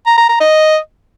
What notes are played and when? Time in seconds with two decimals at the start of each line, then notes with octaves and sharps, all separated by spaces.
0.06 A#5
0.18 A#5
0.29 A#5
0.40 D#5